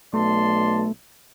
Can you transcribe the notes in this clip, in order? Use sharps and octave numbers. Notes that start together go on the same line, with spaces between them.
B1 A3 D5 A5 C6